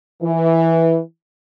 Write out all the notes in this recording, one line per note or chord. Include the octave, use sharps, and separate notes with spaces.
E3